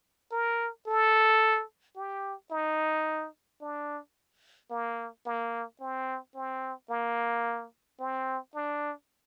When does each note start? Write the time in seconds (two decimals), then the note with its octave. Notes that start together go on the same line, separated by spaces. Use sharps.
0.32 A#4
0.87 A4
1.96 G4
2.51 D#4
3.61 D4
4.70 A#3
5.26 A#3
5.80 C4
6.35 C4
6.90 A#3
7.99 C4
8.54 D4